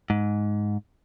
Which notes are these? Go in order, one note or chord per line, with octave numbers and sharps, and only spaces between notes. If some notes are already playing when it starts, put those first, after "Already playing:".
G#2